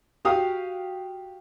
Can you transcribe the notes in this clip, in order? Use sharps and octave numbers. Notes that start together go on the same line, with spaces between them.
F#4 G4 F5 D#6